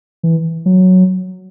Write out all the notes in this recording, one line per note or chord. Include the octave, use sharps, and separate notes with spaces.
E3
F#3